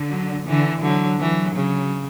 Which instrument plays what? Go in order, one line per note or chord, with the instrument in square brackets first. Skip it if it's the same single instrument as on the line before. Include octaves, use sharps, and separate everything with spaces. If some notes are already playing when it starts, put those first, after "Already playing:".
Already playing: [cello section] D3
[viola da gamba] F#3
[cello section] D3 [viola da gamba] E3
[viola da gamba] D3 [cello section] F#3
[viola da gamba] E3 [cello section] F#3
[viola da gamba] C#3